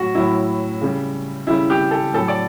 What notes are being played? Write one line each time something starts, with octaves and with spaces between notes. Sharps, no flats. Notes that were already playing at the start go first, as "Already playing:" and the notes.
Already playing: A2 F#3 F#4
A2 F#3 E4
C#3 G3
C#3 G3 E4
G4
A4
A2 F#3 A4
D5